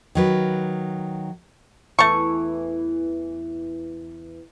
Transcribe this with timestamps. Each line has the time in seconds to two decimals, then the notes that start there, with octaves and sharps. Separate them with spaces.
0.15 D#3 F#3 B4
1.99 E2 E3 A3 C#6